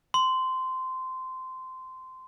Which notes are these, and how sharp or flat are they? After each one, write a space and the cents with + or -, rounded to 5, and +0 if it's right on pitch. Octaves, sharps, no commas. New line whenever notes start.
C6 -15